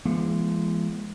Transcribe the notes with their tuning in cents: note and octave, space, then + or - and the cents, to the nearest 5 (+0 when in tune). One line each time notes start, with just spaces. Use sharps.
E3 +45 G#3 +0 B3 -45